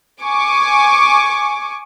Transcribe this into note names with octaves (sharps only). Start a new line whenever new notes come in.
G#5 C#6 D6